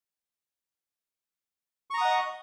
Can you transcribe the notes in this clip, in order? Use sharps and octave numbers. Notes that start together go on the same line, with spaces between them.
D#5 F#5 A#5 C#6 D#6